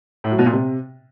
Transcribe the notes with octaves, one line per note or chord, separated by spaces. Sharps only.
A2
F#3
B2
A#2
C3